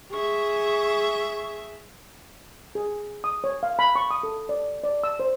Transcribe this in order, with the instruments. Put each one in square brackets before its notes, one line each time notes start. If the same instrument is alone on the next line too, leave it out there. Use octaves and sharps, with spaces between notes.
[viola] G#4 E5 [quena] C#6
[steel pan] G#4
D#6
C#5
F5
B5
C#6
D#6
A4
D5
D5
E6
C5